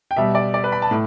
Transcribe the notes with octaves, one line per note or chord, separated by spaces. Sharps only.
G5
B2 G3 E5
D5
D5
B4
B5
A5
A2